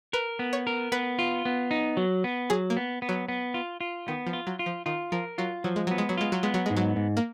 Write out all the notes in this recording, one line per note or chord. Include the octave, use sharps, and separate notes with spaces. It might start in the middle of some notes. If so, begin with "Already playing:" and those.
A#4 B4
B3
C#5
A#4
B3 B4
F4
B3
D#4
F#3
B3
F#3 G#4
A#3
B3
B3
F#3
B3
F4
F4
D#3 B3
F3
F4
F#3
F4
F3
D#3 F4
F3 A#4
F#3 F4
F3 F#3
G#3
F#3 B3
G#3
F#3
G#3 F4
F#3
G#3 B3
F#3
G#2 G#3
F#3
G#2
A#3